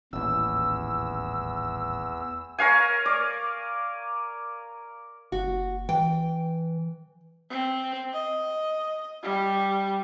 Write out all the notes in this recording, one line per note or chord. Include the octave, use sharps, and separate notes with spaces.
D#1 A1 E2 E6
A#4 C#5 F5 G#5
D5
F#1 F#4
E3 G5
C4
D#5
G3